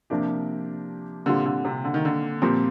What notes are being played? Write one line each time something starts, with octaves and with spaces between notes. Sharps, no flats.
C3 F3 A#3 D4 G4
A#2 D3 G3 C4 F4
D3
C3
D3
D#3
D3
A#2 F3 G3 C4